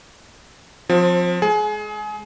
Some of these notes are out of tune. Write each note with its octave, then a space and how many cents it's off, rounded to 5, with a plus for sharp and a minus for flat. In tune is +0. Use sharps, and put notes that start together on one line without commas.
F3 +25 C4 +0
G#3 +0 G#4 +30